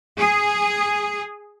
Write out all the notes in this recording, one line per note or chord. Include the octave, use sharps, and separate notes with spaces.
G#4